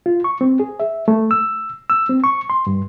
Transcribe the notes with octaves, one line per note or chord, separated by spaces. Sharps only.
F4
C#6
C4
G#4
E5
A3
E6
E6
C4
C#6
C6
G2